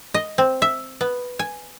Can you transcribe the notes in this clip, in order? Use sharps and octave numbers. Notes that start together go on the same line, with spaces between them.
D#5
C4
E5
B3
G#5